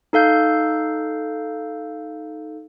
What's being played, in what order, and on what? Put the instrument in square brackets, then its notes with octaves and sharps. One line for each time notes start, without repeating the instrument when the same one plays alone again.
[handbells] D#4 A4 F5 G6